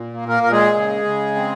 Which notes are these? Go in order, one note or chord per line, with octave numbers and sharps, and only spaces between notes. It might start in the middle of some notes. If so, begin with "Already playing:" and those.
Already playing: A#2
A#3
A#3 A#4
A#2 A#4
G#3 G#4
C#3
C#3
C4